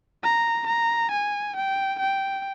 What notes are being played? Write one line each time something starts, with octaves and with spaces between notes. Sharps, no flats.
A#5
A#5
G#5
G5
G5